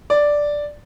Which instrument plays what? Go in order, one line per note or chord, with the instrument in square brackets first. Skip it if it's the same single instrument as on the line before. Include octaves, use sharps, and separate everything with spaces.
[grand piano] D5